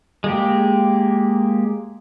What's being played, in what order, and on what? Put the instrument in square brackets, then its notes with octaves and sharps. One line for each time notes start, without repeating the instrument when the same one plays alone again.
[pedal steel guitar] G#3 A#3 G4